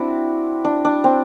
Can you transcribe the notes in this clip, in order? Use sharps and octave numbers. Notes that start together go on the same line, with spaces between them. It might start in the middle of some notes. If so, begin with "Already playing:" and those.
Already playing: C4 D4 E4 F#4
D4
D4
C4